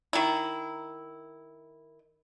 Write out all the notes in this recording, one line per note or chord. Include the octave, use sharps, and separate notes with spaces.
D#3 E4